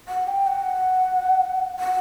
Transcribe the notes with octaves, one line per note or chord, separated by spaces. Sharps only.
F#5
G5
F#5
F#5